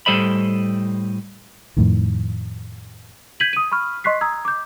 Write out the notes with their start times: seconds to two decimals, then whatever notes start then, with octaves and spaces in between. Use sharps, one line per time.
0.06 A2 G3 A4 C5 D#5 B5
1.77 F2 A2 D#3
3.40 G6 G#6 B6 D#7 F#7
3.53 D#6 D#7
3.72 B5 C#6 F6
4.04 D#5 C6 C#6 F#6 B6 C7
4.21 A#5 D#6 E6 G#6
4.45 D6 G6